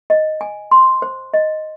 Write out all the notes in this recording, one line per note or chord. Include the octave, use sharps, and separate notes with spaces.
D#5
G#5
C6
C5
D#5